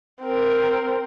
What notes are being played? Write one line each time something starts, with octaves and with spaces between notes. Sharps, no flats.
C4 A#4